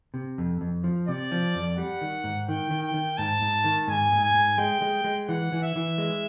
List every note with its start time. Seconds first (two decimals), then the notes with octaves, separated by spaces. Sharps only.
0.14 C3
0.38 F2
0.61 F2
0.84 F3
1.08 C3 D5
1.32 F3
1.55 F2
1.77 G3 F#5
2.01 D#3
2.24 G#2
2.48 D#3 G5
2.71 D#3
2.83 G5
2.94 D#3
3.17 G#2 A5
3.42 G#2
3.64 D#3
3.88 G#2 G#5
4.12 G#2
4.23 G#5
4.34 G#2
4.58 G#3 G5
4.82 G#3
5.04 G#3
5.28 E3 F#5
5.52 E3
5.63 E5
5.76 E3
5.98 G#3